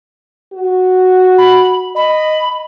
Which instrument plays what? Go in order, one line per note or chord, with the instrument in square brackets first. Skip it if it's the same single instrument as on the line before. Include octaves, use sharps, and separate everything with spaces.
[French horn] F#4
[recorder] B5
[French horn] D#5 [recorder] B5